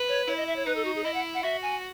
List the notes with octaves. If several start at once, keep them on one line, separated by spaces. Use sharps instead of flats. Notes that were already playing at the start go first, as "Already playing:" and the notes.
Already playing: B4
C#5
E4 C#5
D#5
E5
C#5
D#4 B4
A4
F#4
G#4
E4 D#5
F#5
F#5
F#4 E5
G#5